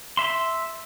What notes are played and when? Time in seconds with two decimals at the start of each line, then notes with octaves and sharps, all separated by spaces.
0.17 E5 C6